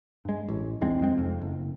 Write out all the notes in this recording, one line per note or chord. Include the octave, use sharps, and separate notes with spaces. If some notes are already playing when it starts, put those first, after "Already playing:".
G2 G#3
A1
B1 E2 G#3 C4
F2 G#3 C4
F1 F2
F#1